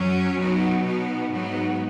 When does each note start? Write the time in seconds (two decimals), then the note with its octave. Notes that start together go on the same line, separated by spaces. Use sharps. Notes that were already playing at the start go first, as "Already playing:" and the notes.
Already playing: F#2 F#3 C#4
0.38 B2 F#3 B3 D#4
0.84 B2 B3 D#4
1.31 G#2 F#3 B3 D#4